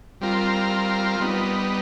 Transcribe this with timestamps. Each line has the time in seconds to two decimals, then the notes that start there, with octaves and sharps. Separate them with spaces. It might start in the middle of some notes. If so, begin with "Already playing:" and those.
0.21 G3 C4 F4 A#4
1.20 G3 B3 D#4